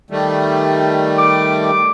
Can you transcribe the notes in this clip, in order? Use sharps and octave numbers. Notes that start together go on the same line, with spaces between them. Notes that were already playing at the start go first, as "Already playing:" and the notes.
D#3 G3 A3
D6